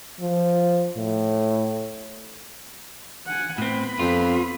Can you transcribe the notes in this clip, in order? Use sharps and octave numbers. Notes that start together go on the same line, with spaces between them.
F3
A2
F#5 G#5
A2 B3 C4 B5
F2 F4